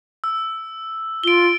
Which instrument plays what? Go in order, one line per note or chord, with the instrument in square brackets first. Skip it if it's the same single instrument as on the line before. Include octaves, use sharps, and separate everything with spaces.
[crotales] E6
[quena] F4 [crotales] D7 G7